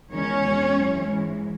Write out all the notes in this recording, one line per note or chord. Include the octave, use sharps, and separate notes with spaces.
E2 D#3 G#3 C#4 C#5
B2 G#3
F#2 E3 G#3
G#2 E3 G#3